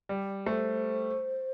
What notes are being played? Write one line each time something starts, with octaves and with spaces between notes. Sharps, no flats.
G3
A3 C5